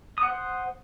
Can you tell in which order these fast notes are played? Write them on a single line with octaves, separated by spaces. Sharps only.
D#6 F#5 C5